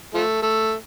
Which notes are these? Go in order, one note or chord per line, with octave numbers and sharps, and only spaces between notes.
F3 A3
A3